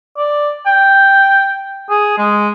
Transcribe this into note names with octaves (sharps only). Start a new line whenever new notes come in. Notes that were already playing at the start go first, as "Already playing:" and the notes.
D5
G5
G#4
G#3